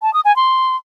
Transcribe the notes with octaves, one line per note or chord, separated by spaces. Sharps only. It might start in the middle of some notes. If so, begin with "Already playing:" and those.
A5
D#6
G#5
C6